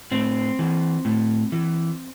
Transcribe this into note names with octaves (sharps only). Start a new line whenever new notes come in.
A2 C4
E3
A2
E3